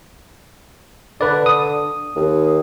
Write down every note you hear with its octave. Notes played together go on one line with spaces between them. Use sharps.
D3 B4 D5
D#6
D#2